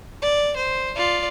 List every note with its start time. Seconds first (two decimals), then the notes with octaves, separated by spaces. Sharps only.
0.22 D5
0.56 C5
0.96 F4 D5